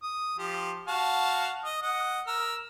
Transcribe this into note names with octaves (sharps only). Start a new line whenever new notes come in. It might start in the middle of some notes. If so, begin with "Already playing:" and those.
D#6
F3 G4
F#4 F5 A5
D#5
D#5 F#5
A#4 E6